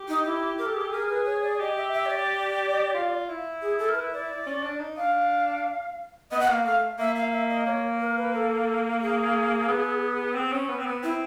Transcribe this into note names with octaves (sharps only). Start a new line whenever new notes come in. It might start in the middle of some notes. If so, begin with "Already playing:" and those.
Already playing: G4
D#4
E4
A#4
A4
G#4
A4
G#4 A#4
B4
C#5
D5
G4 D#5
E5
E5
C#5
D5
F4
E4
G#4
A4
A#4
B4
D5
C#4
D4
D#4
D4 F5
B3 D#5
F#5
A#3 F5
A3 F5
A#3 E5
F5
E5
D#5
A#3 C#5
A#4
B4
A4
G#4
B3
C4
C#4
B3
C4
B3
C4 E4